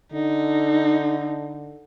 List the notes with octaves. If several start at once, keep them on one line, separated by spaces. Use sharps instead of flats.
D3 D#4